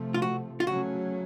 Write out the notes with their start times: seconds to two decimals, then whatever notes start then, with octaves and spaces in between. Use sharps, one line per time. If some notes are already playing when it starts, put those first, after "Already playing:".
Already playing: C3 F3 A3
0.14 F4
0.22 F#4
0.60 F4
0.67 C#3 F#3 A3 C#4 F#4